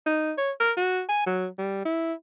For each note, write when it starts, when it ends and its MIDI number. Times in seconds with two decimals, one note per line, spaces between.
0.06 0.33 63
0.38 0.52 73
0.60 0.72 70
0.77 1.02 66
1.09 1.25 80
1.26 1.47 54
1.58 1.83 55
1.85 2.13 64